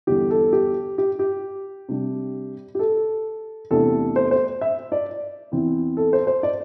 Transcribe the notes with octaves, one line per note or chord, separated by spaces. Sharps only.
E2 D3 G3 G4
A4
G4
G4
G4
C3 G3 D4
G4
A4
E2 C3 A3 D4 A4
C5
C5
E5
D5
E2 E3 C4 E4
A4
C5
C5
D5